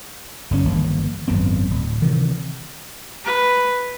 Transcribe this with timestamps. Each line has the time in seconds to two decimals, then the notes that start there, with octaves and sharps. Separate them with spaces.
0.51 F#1 D#3 C#4
0.65 G1 D#3 E3 A#3
1.28 G#1 F#2 B3 C4
1.70 D1
2.02 C3 D#3 E3
3.25 B4